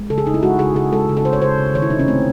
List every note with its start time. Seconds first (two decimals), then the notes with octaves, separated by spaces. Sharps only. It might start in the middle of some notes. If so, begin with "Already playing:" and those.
Already playing: G#3
0.10 C#3 A4
0.18 G#4
0.26 C#3 D#4
0.34 E4
0.43 G#3 F#4
0.59 C#3 G#4
0.75 C#3 G#4
0.92 G#3 A4
1.09 C#3
1.17 A4
1.25 C#3 C5
1.33 C#5
1.42 C#3 C5
1.58 C#3
1.74 D#3 C#5
1.82 E4
1.90 C3 D#4
2.00 C#4
2.08 A3 C4